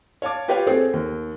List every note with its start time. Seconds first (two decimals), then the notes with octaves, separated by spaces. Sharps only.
0.22 C#5 F5 A5 D6
0.48 F4 G4 B4 C#5 F5 G5
0.67 A3 C4 G#4 A4 C5
0.93 D#2